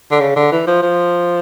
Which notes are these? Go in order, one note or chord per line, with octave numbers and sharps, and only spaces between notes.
D3
C#3
D3
E3
F3
F3